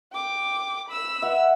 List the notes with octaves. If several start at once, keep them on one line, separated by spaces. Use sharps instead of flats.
G5 D6
B5 E6
E5 F#5